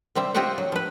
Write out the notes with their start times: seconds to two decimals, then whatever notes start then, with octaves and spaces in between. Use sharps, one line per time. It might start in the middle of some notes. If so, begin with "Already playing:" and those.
0.15 C3 G3 C4 E5
0.34 C4 F4 G4 D#5 E5 F#5
0.58 F#3
0.72 F3 B4